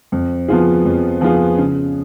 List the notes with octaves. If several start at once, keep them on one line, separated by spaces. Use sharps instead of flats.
F2
F3 B3 F4 G#4
F2
F3 B3 F4 G#4
C#3